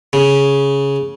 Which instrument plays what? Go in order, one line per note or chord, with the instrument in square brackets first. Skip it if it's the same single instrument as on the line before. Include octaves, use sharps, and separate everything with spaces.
[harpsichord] C#3